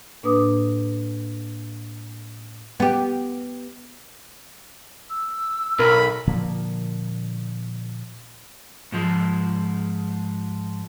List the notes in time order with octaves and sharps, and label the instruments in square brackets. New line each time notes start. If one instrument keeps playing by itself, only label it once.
[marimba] A2 A#3 D4 B4 D6 D#6
[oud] B3 G4
[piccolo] E6
[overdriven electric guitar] B1 [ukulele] A#4 [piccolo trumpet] B5
[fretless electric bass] A#2 D3 F3 A#3
[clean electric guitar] G#2 F3 G#3